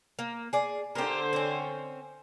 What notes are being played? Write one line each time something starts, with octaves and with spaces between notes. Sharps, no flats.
A#3
G#4 D5
D3 G4 A#4 C5
C4 C#4